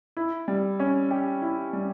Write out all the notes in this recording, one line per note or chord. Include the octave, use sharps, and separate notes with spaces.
E4
G3
C#4
G4
E4
G3